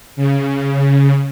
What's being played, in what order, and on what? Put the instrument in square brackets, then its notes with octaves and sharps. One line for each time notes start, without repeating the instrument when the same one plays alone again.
[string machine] C#3